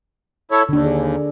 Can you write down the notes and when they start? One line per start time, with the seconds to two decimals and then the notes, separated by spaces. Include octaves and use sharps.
0.51 E4 A4 C#5
0.69 D#2 D3 D4
0.84 G#4